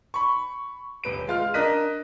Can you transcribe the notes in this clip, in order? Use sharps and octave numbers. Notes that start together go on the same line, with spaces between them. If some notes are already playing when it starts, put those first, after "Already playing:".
B5 C#6
D#1 B4 D7
G#3 F4 F6
D4 A#4 D#5 F#6 B6 D#7